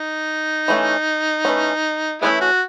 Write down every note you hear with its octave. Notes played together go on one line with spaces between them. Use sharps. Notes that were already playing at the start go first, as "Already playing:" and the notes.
Already playing: D#4
E3 A3 C#4
E3 A3 C#4
E3 G#3 A3 B3 C#4 E4
F#4